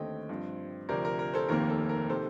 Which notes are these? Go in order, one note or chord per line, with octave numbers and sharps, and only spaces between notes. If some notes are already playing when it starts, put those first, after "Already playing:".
Already playing: D#2 D3 A3 C4 D#5 G5
G2 F3 C4
D2 C3 F3 A#4 D5
A#4
A#4
A4 C5
F1 D#2 D#3 A#3 A#4
A4
A#4
C3 D#3 A4 C5